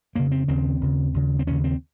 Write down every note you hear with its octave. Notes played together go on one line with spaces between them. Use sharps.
F2 C#3 A#3
C4
D#2 C#3 C4
D#2 C#3
D#2 C#3
C4
D#2 C#3 C#4
C4